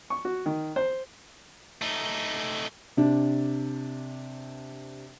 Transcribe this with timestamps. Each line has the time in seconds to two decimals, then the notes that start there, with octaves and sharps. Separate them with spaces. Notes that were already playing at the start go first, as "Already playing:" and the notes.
0.10 C#6
0.25 F#4
0.46 D#3
0.76 C5
1.82 A3 D#4
2.97 C3 D4